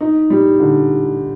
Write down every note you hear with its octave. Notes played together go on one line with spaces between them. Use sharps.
D#4
G3
D3